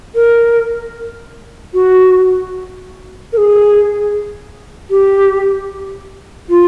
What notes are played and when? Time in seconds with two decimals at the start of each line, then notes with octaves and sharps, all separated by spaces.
0.15 A#4
1.74 F#4
3.33 A#4
3.37 G#4
4.91 G4
6.49 F4